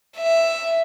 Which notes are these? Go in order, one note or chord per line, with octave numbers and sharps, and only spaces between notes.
E5